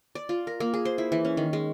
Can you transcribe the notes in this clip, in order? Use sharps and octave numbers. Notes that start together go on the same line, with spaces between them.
D5
F4
A#4
A#3
G#4
C5
E4
E3
C#4
D#3
G#3